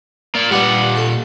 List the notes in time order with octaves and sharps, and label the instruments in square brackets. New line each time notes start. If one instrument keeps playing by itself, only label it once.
[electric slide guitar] A#3 D5
[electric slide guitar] A#2 F#5 [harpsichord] G3 D4 B4
[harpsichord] A4 A5